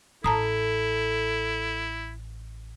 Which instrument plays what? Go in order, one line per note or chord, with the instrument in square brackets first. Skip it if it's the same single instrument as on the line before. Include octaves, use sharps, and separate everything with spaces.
[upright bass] A1 [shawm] E4 [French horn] A4 [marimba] A5 A#5 D#6